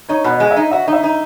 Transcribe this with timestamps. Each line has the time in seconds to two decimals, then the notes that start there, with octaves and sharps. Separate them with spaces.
0.09 D#4 C#5
0.24 B2
0.30 D#5
0.40 G#3
0.51 E5
0.57 D#4
0.71 F#4 E5
0.87 D#4
0.93 E5
1.04 D#4